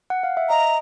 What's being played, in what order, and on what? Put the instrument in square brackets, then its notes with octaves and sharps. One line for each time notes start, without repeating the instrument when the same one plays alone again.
[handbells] F#5
F5
E5
[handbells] D#5 [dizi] A#5